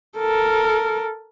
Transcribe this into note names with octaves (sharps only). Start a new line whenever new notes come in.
A4 A#4